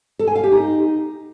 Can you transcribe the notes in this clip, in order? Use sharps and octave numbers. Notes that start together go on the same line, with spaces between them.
A4
G#5
F5
G4
D#4